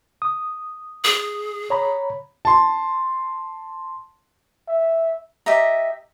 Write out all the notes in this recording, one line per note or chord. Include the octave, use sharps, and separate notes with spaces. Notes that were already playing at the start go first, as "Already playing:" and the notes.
D#6
G#4
C#5 A#5 B5
A5 C6
E5
G4 D#5 E5 A#5